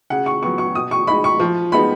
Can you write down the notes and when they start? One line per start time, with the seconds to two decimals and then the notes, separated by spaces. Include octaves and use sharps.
0.10 C#3 F#5
0.26 C#6
0.43 F#3 B3 C#6
0.58 C#6
0.75 B2 D#6
0.91 C#6
1.07 G#3 D#4 B5
1.24 C#6
1.40 F3
1.72 G#3 B3 D#4 B5